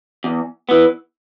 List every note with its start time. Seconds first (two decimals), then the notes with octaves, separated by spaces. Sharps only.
0.24 E2
0.69 E3 B3